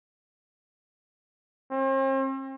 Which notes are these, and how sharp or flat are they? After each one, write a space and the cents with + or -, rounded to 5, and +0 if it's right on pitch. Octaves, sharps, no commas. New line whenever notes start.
C4 +45